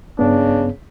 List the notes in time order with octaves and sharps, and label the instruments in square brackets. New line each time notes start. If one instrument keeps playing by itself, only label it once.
[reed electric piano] G2 B3 [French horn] C#3 [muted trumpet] D4